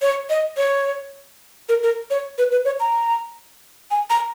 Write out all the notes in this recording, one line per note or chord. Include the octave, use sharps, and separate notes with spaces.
C#5
D#5
C#5
A#4
A#4
C#5
B4
B4
C#5
A#5
G#5
A#5